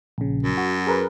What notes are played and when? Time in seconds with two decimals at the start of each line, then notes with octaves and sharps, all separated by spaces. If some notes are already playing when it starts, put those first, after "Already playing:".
0.18 A#1 C#3
0.43 F#2
0.57 F#4
0.87 G#4 A#4 B4